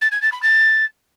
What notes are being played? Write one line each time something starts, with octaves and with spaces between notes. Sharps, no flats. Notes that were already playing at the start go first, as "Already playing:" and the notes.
A6
G#6
A6
B5
A6